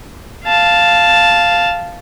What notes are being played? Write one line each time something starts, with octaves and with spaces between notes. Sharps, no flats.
F5 A5